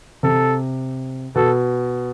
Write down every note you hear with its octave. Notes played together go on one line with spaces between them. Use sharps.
C3 A4
B2 A4